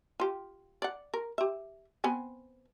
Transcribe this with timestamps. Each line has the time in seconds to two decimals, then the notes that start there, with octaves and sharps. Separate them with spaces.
0.20 F4 G4
0.82 D5 F#5
1.14 A#4
1.38 G4 E5
2.04 B3 C4 G#5